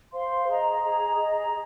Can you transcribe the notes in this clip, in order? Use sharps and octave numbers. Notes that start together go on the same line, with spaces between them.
C5 F5 C6
G#4 D#5 A#5
G#4 D#5 A#5
G#4 D#5 A#5
G#4